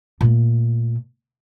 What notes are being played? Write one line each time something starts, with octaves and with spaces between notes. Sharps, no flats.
A#2 A3